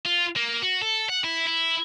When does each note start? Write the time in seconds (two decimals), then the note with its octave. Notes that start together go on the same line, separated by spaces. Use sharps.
0.06 F4
0.36 A#3
0.62 F#4
0.81 A4
1.09 F#5
1.24 E4
1.47 E4